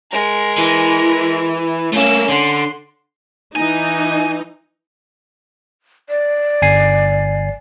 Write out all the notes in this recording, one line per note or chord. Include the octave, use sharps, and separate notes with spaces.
G#3 A#4
E3
A3 A#3 C#4 E6
D3 C6
E3 D#4 G#5
D5
G1 G#5 C7